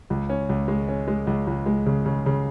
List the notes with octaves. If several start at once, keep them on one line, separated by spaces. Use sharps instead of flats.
C#2
C#4
C#2
G#3
C#4
G#3
C#2
C#2
G#3
C#3
C#3
C#3